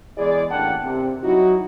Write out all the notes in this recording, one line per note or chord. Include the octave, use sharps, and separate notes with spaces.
E2 G#3 E4 G#4 D5
A1 A#3 D4 F#5 G5 A5
C3
F#3 D#4 E4 F#4